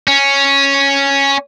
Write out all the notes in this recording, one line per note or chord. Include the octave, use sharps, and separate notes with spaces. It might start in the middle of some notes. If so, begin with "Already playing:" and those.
C#4